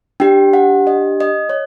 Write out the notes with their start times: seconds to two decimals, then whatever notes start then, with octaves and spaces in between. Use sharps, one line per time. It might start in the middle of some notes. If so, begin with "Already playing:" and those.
0.20 D4 G4 G5
0.53 F#5
0.87 D#5
1.20 D#5
1.49 C#5